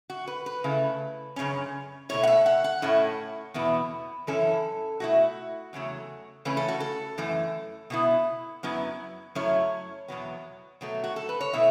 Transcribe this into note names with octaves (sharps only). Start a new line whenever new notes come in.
F#4
B4
B4
C#3 A3 E4
F#2 C#3 E3 C#4
B2 A3 E4 C#5
F#5
E5
F#5
F#5
A2 A3 C#4 E4
E2 B2 B3 E4
F#2 E3 C#4 E4 A4
B2 A3 E4 F#4
E2 C#3 F#3 A3
C#3 E3 A3 C#4 B4
A4
F#4
A4
F#2 E3 A3
B2 B3 E4
F#2 F#3 B3 E4
F#2 F#3 A3 C#4 E4 C#5
E2 B2 F#3 B3
B2 F#3 A3
F#4
A4
B4
C#5
B2 A3 E4 E5